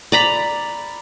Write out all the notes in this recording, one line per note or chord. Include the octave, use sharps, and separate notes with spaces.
D5 A#5 B5